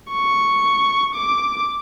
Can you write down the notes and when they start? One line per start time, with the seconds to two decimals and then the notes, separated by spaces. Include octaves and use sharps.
0.11 C#6
1.15 D6